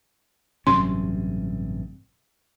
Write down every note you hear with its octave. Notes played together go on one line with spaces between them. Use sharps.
A1 G2 C3 F#3 C#4 C6